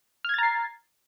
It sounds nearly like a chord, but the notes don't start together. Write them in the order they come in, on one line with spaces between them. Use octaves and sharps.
F6 G#6 A6 A#5 C7